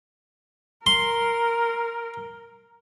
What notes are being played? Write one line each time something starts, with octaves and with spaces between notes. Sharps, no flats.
A#4 C6